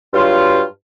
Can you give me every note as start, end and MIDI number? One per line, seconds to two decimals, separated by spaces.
0.14 0.62 43
0.14 0.62 54
0.14 0.62 65